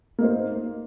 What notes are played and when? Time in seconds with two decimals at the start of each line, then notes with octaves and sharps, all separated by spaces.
0.18 A#3
0.21 D#4
0.24 C5